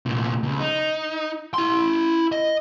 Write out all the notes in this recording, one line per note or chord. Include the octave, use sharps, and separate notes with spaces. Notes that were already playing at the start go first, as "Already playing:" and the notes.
C2 A#2
C#2
D#4
E4 C6
D#5